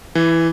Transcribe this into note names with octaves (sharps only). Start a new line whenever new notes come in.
E3